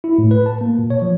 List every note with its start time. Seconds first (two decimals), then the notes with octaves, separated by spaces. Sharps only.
0.04 E4
0.18 A2
0.31 B4
0.46 A5
0.61 A#3
0.78 A#2
0.90 C#5
1.02 F3